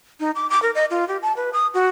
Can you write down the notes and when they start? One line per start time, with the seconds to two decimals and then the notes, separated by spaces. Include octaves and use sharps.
0.20 D#4
0.35 D6
0.50 D6
0.62 A#4
0.75 D#5
0.90 F4
1.08 G4
1.22 A5
1.36 B4
1.53 D#6
1.74 F#4